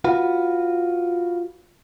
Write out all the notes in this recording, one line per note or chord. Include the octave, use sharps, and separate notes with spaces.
F4 F#4 B4